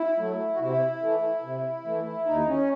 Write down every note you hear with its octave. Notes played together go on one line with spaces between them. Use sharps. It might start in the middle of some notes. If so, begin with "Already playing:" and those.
Already playing: E4
F#3 A3
F#4
C3 E4
E3 A3
C3
E3 A3
D#2 D#4
C#4